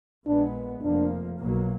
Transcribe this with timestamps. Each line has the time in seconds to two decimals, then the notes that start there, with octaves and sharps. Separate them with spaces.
0.27 A#1 A#2 G#3 B3 D4
0.82 F1 F2 F3 A#3 D4
1.38 B1 B2 F#3 A#3